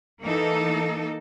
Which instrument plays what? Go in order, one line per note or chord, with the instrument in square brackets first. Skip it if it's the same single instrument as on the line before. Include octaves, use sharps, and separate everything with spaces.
[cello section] E3 A#3 D#4 A4